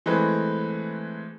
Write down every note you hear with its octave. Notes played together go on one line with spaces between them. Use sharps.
E3 G#3 A3 C4 B4